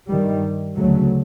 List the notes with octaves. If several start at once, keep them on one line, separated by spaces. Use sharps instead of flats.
G2 D#3 G3
D2 C#3 F#3 A3